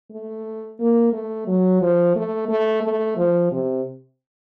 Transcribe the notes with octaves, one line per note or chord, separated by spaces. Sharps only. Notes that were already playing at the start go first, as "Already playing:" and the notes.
A3
A#3
A3
F#3
F3
A3
A3
A3
F3
C3